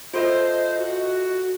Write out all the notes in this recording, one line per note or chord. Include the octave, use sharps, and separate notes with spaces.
F4 A4 C5 D#5 E5
F#4